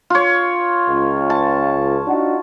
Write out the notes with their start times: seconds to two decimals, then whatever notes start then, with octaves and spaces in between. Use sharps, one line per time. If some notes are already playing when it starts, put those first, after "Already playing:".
0.10 F4 C#5
0.89 C#2
1.30 A5
2.08 D4 D#4 F#4